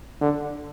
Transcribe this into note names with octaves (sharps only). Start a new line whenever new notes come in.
D3